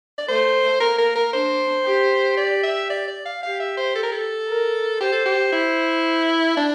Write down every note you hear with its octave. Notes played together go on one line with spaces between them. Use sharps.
D5
A3 C5
A#3 A#4
A#4
A#4
D4 C5
G4
D5
E5
D5
D5
F5
G4 F5
E5
C5
A4
A#4
A4
A#4
G4 C5
A4
G4
E4
D4